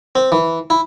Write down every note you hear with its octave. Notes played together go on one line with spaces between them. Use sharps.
C4
E3
E4